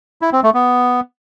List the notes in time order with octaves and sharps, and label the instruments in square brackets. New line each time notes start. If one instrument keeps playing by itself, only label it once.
[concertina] E4
C4
A3
B3